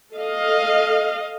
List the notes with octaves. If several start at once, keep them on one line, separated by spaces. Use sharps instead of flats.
A4 D#5 F5